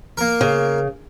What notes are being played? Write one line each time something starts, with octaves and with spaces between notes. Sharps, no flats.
A#3 A#4
C#3